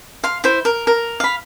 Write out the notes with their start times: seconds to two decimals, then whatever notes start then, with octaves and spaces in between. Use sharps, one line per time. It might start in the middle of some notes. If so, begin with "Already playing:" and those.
0.24 F5 C6
0.44 E4 C5
0.65 A#4
0.87 A#4
1.20 F5 B5